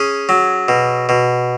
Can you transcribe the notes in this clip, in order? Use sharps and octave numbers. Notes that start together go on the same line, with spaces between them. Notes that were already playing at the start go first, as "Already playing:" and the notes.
Already playing: C#4 G#4
F#3
B2
B2